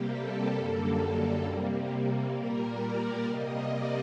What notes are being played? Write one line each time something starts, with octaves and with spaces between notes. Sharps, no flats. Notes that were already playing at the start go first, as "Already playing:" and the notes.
Already playing: C3 G3 A#3 G4
A4
F#2 D3 G3 A#3 A4
C3 G3 A#3
A#2 G3 A#3 A#4
D5
C3 G3 A#3 D#5
D5